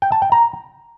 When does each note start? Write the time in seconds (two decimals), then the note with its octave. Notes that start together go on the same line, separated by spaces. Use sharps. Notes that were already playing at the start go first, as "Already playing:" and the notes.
0.02 G5
0.12 A5
0.22 G5
0.32 A#5